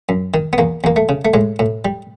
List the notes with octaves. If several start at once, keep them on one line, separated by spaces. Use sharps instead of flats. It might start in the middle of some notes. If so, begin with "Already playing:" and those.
F#2
D#3
B3
E2 A#3
E2 A#3
A3
C#3
A3
A2 G#3
A2
G3